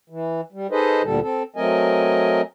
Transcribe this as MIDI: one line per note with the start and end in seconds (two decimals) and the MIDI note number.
0.10 0.41 52
0.52 0.67 55
0.71 1.02 63
0.71 1.02 68
0.71 1.02 69
0.71 1.02 71
0.71 1.02 72
0.71 1.02 75
1.03 1.20 38
1.03 1.20 46
1.03 1.20 50
1.03 1.20 55
1.03 1.20 69
1.22 1.43 60
1.22 1.43 69
1.56 2.41 54
1.56 2.41 57
1.56 2.41 60
1.56 2.41 70
1.56 2.41 75
1.56 2.41 80